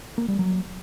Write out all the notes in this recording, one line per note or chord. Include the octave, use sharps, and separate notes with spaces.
A#3
G3
F#3